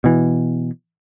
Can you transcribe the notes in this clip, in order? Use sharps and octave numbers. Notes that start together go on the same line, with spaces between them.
B2 E3